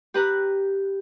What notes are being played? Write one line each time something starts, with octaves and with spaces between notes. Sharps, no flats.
G4 B4 A#5 F#6